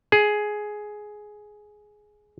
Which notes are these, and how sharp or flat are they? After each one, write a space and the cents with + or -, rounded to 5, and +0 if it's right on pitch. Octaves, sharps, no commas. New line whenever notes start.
G#4 +10